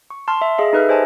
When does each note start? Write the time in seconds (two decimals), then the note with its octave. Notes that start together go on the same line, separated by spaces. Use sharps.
0.10 C#6
0.28 A5 C6 F6
0.42 E5
0.58 G#4 D#5 F5
0.73 D#4 A4 B4 E5 F6
0.88 G4 C5 D#5 G#5 A5